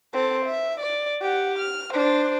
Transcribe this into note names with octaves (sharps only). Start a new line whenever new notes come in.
C4 A4
E5
D5
G4 F#5
F6
D4 C5